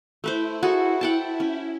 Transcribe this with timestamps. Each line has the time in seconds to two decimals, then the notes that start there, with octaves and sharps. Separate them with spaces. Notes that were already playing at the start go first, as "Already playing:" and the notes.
0.24 A3 E4 B4 C5
0.63 F#4 G#4 A4
1.01 F#5 G5 A5
1.40 C#4